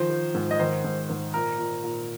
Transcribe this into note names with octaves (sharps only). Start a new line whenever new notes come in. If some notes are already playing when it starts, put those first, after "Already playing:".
Already playing: D#3 F3 C5
F3
G#2
D#5
D#3 C5
G#2
G#2
A#2 A#4
A#2
A#2